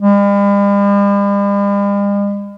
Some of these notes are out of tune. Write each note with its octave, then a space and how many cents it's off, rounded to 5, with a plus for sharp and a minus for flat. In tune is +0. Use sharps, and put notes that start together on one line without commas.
G3 +45